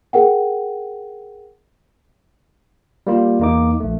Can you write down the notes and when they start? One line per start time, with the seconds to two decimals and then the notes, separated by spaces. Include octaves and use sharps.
0.13 G#4 A#4 F#5 G5
3.07 G3 A#3 F4
3.40 E2 A#3 D#4 D6
3.80 A#1 A3